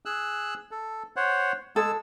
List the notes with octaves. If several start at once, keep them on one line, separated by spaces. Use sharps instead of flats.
G#4 E6 F#6
A4
C5 C#5 F#5
G#3 G#4 A4 E6